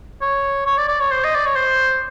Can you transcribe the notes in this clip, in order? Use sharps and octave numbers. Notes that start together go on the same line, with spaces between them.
C#5
C#5
D5
D5
C#5
C5
D#5
D5
C#5
C5